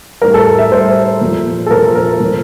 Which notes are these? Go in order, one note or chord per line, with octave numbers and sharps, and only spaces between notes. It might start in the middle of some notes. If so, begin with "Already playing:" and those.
A2 G3 A#4
A4
E5
A2 G3 C5
A#2 F3
A4
A#2 F3 A#4
A#4
A#2 F3